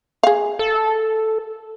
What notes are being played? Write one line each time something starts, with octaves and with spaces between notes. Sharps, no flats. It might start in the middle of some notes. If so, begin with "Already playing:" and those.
G#4 F5
A4